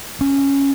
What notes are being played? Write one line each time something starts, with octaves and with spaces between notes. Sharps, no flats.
C#4